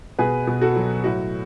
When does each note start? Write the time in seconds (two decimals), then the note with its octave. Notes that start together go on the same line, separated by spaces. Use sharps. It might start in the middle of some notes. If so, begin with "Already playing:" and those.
0.19 B2 G#4 B4
0.47 B2
0.61 F#4 A4
0.76 F#3
1.04 A2 F#4